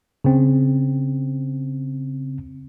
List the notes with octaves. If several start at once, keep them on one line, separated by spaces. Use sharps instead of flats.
C#3 C4